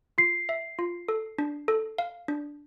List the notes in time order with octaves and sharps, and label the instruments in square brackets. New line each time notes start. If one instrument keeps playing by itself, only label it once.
[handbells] F4 [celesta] C7
[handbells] E5
F4
A4
D4
A4
F5
D4